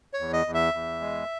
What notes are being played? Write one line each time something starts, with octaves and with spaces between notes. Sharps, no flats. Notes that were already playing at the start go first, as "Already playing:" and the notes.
C#5
E2
D#5
E2
E5
E2
G#3